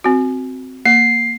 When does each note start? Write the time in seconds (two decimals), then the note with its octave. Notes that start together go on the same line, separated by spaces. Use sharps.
0.04 C4 F#4
0.86 A#3 C7